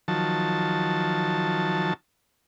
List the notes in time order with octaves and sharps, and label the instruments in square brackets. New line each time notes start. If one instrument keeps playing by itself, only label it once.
[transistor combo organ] D#3 F3 F#3 A5